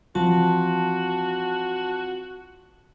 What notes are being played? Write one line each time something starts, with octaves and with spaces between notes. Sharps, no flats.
E3 F3 C4 F4 F#4 A5